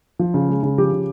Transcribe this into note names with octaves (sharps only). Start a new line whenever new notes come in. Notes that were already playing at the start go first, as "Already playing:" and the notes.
F3
C#3
G#3
C#3
F3 G4
C#3